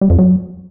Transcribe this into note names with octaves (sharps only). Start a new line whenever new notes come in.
G3
F2
F#3